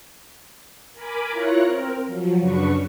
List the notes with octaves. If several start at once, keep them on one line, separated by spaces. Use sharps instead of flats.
A#4 G#5 B5 D6
E4 F4 A#4 C#5 F#6 A#6
C4 A#4
F3 F#3
F#2 C#3 F#3 D4 B4 C#6